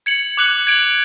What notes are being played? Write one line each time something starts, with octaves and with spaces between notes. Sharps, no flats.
G#6 C#7 F#7
D6 F#6 C#7 F#7
G#6 D7 F#7